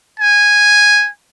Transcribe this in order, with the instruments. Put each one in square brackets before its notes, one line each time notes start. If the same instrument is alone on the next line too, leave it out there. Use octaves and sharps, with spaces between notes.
[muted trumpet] G#5